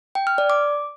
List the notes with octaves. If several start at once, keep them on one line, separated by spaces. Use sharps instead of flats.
G5
F6
D5
D6